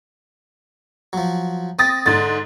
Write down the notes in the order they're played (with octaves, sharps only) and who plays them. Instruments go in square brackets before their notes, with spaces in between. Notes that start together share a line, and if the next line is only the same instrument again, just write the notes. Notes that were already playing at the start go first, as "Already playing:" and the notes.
[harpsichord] F3 F#3
[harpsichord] C4 [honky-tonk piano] D#6 A6 A#6
[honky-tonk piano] G#2 A6 [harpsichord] D3